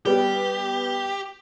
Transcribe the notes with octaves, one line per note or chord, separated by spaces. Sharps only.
G3 B3 G4